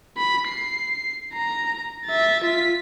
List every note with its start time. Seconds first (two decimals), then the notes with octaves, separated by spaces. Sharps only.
0.17 B5
0.48 C7
1.34 A#5
2.06 E5 A6
2.45 F4 B6